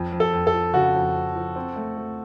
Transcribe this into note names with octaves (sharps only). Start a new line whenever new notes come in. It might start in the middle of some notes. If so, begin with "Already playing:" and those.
Already playing: F2
F2
A4
F2
A4
F3
C#3 F#4
F2
F2
F3
C4
A3
A3